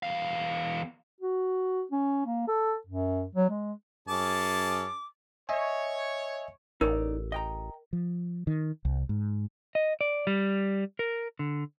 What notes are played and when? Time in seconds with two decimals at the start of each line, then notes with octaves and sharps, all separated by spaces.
0.03 E2 F5
1.20 F#4
1.91 C#4
2.26 A#3
2.48 A4
2.87 F#2
3.35 F#3
3.49 G#3
4.08 F#2 C#4 G#4 A5 D6
5.49 C#5 D#5 E5 G#5
6.81 A1 D#4 A#4 C#5 D5
7.32 D#5 G5 A#5
7.93 F3
8.47 D#3
8.85 C2
9.09 G#2
9.75 D#5
10.01 D5
10.27 G3
10.99 A#4
11.39 D3